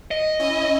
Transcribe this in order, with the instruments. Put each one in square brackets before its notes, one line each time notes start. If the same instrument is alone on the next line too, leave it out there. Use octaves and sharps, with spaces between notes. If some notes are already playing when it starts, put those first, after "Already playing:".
[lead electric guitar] D#5
[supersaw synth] C#4 E4